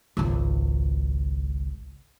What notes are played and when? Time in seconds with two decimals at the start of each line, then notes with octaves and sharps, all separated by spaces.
0.17 G#1 C#2